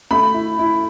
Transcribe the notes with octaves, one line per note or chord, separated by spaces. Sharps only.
A3 B5
E4
E4